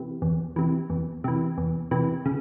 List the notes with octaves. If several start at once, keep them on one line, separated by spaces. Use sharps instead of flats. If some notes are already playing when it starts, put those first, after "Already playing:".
Already playing: C3 E3
E2
C3 E3
E2
C3 E3
E2
C3 E3
C#3